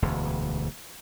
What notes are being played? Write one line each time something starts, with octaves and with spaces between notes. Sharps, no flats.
E1 D2